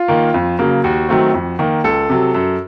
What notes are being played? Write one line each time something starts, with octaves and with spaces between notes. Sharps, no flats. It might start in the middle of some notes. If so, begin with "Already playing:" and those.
Already playing: F4
D#3 A#3
F2
C#3 F#3 A#3
D#2 F#4
D#3 F#3 A3 C4
F2
D#3 A#3
C#2 A4
C3 F#3
F#2